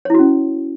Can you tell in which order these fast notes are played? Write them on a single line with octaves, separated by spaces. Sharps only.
C#5 E4 F#4 C#4